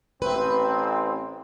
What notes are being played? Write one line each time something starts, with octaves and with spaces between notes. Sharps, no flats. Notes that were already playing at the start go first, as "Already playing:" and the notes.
A1 C4 B4 E5